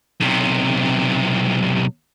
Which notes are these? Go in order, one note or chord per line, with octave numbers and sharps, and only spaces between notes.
B1 C3